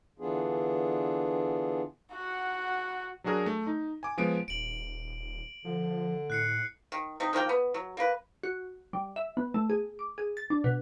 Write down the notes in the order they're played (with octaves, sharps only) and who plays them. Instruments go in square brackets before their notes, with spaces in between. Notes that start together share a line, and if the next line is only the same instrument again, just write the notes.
[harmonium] D3 E3 B3 D4 F4 G#4
[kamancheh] F#4 F#5
[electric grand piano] F#3 D4 F#4 G#4 A#4
A3
D#4
G#5 D6
F3 G#3 B3 D7
[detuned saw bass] D#1 [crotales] D7 F#7
[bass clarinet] D3 [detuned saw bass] F3
[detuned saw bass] A2 [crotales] F#6 C7 C#7
[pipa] D#3
C3 D#4
D#3 F3 A#3 G5
B3
F#3
A#3 B4
[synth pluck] F#4
G3
E5
B3
A3
G#4
D6
G#4
A6
D4
B2